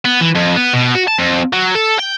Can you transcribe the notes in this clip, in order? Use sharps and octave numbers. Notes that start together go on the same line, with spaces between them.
B3
E3
F2
B3
B2
F#4
A5
F2
F#3
A4
G5